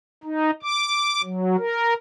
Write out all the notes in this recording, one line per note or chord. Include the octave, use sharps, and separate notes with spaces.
D#4
D6
F#3
A#4